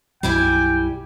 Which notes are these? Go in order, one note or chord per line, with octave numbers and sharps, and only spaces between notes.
B1 F#2 G3 E4 G5 G#5